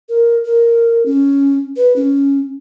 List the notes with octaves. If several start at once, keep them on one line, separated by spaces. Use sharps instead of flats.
A#4
A#4
C#4
B4
C#4